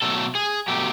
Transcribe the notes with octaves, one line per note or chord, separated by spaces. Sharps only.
B2 F#3 A3 A4
G#4
B2 F#3 A3 G4